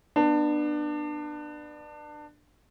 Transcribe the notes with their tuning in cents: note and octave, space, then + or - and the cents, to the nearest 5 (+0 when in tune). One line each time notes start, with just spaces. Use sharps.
B3 -15 D4 +25